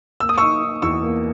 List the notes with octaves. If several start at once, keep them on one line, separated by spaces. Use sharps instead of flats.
A#3 E6
D#6
D#4 C#6 E6
D#4
E2 C#6 E6
A#3